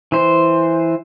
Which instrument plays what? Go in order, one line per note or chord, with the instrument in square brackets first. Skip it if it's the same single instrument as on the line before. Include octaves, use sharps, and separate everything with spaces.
[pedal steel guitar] E3 C5